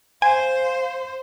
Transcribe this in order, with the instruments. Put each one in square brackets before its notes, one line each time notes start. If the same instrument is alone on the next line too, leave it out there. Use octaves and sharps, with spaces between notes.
[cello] C5 [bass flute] F5 [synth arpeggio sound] G#5